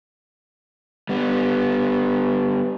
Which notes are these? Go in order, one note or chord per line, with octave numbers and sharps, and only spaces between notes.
G3 B3